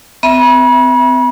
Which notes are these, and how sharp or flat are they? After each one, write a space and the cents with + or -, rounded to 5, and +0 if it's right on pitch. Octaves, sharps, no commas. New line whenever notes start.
C4 -40 E5 +0 B5 -40